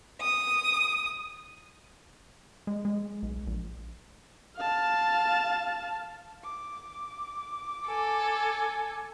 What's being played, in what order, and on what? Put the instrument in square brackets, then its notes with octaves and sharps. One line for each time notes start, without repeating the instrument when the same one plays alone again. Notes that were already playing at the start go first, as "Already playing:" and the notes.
[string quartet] D#6
[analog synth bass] G#3
G#3
B1
A#1
[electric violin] F5 A5
[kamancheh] D6
[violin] A4 [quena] G#5